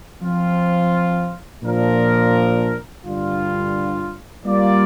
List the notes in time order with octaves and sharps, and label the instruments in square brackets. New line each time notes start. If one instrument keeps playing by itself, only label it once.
[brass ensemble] F3 C4 F4
A#2 F3 D4 A#4
G2 D3 G3 D4 F4
G3 A#3 F4 D5